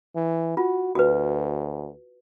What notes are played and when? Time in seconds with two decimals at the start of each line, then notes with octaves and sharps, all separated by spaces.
0.15 E3
0.57 F4 F#4
0.95 D2 F#4 B4